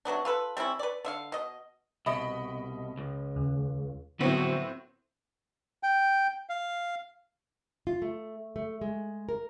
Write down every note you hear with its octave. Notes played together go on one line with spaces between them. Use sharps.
C3 F#3 B3 D4
F4 A4 B4
G3 C4 C#4 E4
B4 D5
D3 E5 F5
B2 D#5
C2 B2 D#5 B5
C#2
D#2 C#3
A2 D3 F#3 B3 C4 F#4 B4
G5
F5
F4
A3
A3
G#3
A#4